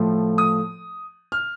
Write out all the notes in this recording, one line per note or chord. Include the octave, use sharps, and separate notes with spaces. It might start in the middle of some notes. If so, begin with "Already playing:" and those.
Already playing: A2 F3 A3
D#6
F6